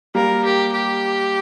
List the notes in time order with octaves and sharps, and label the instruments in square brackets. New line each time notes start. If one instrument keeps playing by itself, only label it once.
[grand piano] G3 A#3 [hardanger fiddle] A#4
[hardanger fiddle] G4
G4